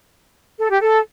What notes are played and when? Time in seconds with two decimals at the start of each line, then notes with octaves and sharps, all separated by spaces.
0.59 A4
0.69 G4
0.81 A4